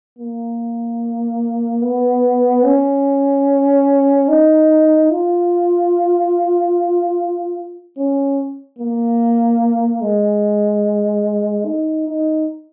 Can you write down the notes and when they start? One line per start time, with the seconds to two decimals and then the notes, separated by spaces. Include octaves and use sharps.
0.19 A#3
1.82 B3
2.64 C#4
4.29 D#4
5.11 F4
7.97 C#4
8.79 A#3
10.01 G#3
11.66 D#4
12.08 D#4